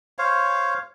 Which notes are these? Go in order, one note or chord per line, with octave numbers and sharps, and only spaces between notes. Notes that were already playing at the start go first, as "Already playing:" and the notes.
C5 C#5 F5